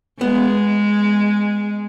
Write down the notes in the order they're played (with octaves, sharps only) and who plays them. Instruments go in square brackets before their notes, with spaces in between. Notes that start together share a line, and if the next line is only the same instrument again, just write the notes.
[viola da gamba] G#3 [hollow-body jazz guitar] B3